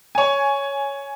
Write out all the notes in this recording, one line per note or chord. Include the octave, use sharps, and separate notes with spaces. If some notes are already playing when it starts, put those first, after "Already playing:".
C#5 G#5